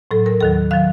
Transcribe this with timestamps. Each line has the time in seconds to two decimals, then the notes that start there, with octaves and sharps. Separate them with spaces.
0.11 A2 F#3 A4
0.26 A#4
0.41 D#2 D#3 F#3 A4
0.71 D#3 F#3 F5